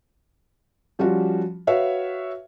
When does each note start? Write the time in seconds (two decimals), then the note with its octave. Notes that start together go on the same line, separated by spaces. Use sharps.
0.99 F3 G3 C#4 F4 F#4
1.67 F#4 B4 C#5 E5 F5